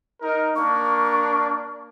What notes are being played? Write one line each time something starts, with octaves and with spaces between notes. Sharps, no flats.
D#4 A#4
A#3 D4 A#4 C#6